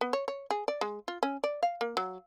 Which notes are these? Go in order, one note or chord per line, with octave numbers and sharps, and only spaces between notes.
B3
C#5
C#5
G#4
D5
G#3
F4
C#4
D5
F5
A#3
F#3